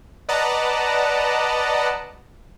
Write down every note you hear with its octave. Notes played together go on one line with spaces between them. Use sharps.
B4 D5 D#5 F#5 A5 A#5